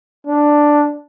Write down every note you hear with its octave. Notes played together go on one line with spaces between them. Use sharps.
D4